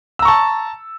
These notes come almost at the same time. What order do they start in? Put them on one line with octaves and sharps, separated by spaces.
E6 A#5 C#6 A5